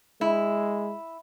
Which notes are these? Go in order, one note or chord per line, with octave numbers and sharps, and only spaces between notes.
G#3 E4